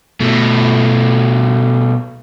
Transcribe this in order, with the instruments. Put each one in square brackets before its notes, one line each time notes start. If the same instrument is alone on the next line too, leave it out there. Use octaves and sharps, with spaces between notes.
[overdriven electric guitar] B2 A3